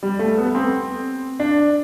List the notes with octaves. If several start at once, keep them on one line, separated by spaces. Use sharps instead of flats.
G3
A3
B3
C4
D4